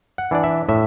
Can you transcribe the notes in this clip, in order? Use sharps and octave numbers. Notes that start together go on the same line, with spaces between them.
F#5
E3 D4 D5
E5
A2 E5